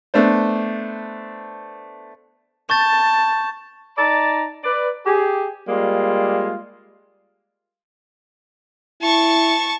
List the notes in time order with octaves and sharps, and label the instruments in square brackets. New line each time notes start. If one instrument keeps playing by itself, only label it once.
[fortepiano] A3 B3 D4 C5
[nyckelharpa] A5 [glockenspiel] C#6 G6 A6
[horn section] D#4 D5 A5 A#5
B4 D5
G4 G#4
G3 G#3 A#3 F4
[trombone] E4 [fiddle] A5 C#6